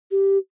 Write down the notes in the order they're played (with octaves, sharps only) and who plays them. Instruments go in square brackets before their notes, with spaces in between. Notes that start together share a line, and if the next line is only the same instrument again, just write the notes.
[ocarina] G4